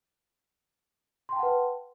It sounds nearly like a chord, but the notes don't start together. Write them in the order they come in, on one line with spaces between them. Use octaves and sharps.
C6 G5 A5 F#5 B4